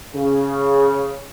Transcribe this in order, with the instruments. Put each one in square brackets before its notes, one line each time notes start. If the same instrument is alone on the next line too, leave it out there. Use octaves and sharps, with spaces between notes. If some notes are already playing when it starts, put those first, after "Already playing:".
[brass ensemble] C#3